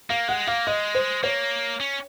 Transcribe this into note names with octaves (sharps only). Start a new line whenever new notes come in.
A#3 F5
G#3 F#5
A#3 F5
G#3 D#5
C5
A#3 C#5
C#4